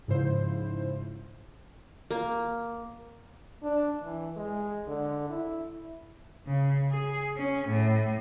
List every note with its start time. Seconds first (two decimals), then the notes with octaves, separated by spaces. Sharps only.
0.08 G#2 C#3 F3 E4 C5
2.11 A#3
3.63 D4
4.03 E3
4.37 G#3
4.87 D3
5.29 E4
6.47 C#3
6.90 G#4
7.37 C#4
7.68 A2